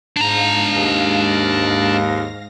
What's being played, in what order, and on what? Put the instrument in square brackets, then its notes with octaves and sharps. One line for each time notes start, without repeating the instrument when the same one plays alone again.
[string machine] G#2 F5 A#6 [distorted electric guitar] D4 A#5
[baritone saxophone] D#2